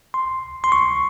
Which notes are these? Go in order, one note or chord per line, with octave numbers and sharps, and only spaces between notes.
C6
C6
C#6